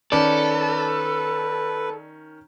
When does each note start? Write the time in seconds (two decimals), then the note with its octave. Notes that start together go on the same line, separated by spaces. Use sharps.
0.12 D#3 C#4 A4 B4 D5